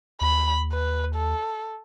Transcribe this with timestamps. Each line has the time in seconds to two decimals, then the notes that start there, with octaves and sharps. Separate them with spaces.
0.21 D#2 B5
0.72 B4
1.15 A4